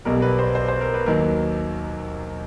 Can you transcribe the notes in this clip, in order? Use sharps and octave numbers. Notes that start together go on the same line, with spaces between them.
B1 B2 G3 A#4
B4
C5
C5
C5
A#4
B4
D#2 D#3 F#3 A#4